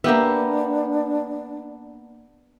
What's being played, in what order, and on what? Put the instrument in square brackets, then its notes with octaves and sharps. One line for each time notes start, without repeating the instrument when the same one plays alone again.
[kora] A#3 G4 E5 [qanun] B3 [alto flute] D4